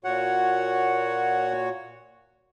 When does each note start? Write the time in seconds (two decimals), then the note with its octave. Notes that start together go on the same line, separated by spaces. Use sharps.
0.04 A#2 F#4 C#5 F#5